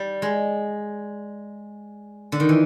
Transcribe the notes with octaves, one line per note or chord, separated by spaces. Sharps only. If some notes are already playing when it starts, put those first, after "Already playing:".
Already playing: G3
G#3
D3
D#3
E3